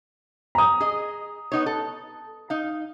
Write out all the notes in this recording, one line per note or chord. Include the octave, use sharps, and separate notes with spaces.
A#5 D#6
G#4 D#5
B3 D#4 C#5
A4
D#4 F5